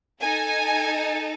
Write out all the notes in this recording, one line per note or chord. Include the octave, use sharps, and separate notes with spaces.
D#4 A4 G#5